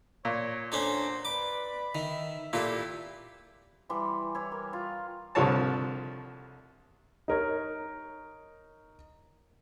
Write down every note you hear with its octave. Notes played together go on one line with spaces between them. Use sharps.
A#2 C#5
C#4 D4 F#4 A4 C5 A#5 D6
B4 D5 B5 D6
D#3 E5
A#2 E4 F4 G4 A4
E3 G3 B5 C6
E4 C#5
A#4
F4
C2 D3 F3 G3 C#5 A5
D#4 A#4 C#5